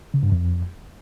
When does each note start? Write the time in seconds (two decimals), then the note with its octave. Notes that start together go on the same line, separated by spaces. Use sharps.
0.14 C#3
0.23 G2
0.32 F2